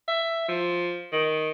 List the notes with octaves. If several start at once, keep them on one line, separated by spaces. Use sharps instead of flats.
E5
F3
D#3